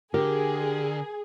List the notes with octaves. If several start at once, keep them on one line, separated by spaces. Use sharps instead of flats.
D3 G4 G#4 A#4